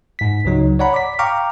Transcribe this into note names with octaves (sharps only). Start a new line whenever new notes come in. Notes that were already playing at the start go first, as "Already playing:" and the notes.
G#2 B6
C#2 C#3 F#3 D#4
C#5 D5 F#5 A#5 B5
D6 B6
F5 G5 A#5 C#6 D6 F6